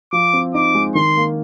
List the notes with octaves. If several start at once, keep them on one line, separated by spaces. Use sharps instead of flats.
F3 D6
C4
D#4 D6
G#3
D#3 C6
A#3